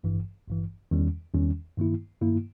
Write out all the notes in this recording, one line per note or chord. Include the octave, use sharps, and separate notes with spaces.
G#1 G2 E3
G#1 G2 E3
E2 D#3 G3 C#4
E2 D#3 G3 C#4
G2 D#3 A#3 E4
G2 D#3 A#3 E4